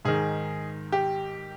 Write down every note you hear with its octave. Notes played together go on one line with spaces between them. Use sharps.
G#2 D#3 G#4
G4